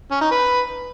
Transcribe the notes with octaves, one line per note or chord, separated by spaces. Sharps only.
C#4
D#4
B4